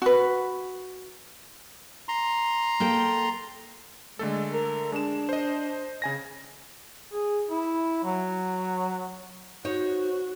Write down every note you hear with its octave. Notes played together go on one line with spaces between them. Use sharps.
F#4 B4
A#5 C6
A#3 A4 G5
D3 G#3 A3 A4
A#4
G#3 D4 E7
C5 D#5
C#3 G#5 A#6
G#4
E4
F#3
D#4 F#4 C5 C#5